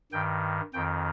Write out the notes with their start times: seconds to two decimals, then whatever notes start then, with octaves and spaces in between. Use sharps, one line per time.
0.12 G2 D#3 G5
0.73 F2 D#3 G5